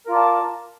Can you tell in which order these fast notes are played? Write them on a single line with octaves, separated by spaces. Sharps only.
A#4 F4 D5 A5